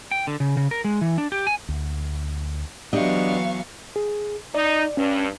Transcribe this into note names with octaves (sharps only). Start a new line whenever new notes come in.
G5
D3
C#3
C#3
A#4
G#3
E3
D4
G4
G#5
D2
E3 F#3 B3 D4 G4 D#5 F5 C#6
G#4
D#4 D5
G2 C#4